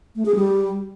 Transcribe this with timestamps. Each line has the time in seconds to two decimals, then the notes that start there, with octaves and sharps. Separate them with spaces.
0.16 A3
0.26 G#4
0.35 G3